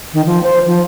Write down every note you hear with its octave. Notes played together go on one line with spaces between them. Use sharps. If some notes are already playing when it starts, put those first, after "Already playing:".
D#3
F3
C5
F3